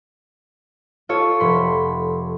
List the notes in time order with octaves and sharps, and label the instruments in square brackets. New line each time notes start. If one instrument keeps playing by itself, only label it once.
[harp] F4 A4 C#5
F1 B5 C6